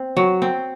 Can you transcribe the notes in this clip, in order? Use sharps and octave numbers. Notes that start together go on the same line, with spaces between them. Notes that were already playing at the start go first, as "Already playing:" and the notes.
Already playing: C4
F#3
C4